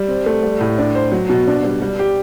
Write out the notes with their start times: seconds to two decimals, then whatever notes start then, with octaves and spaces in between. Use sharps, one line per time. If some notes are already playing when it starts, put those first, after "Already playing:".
Already playing: G3
0.08 C4
0.26 A3
0.43 G3
0.61 A2
0.78 D4
0.95 C5
1.12 F#3
1.30 B2
1.47 D4
1.64 G3
1.82 G3
1.99 G4